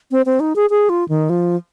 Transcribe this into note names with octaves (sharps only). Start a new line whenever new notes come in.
C4
C4
D#4
G#4
G#4
F4
D#3
F3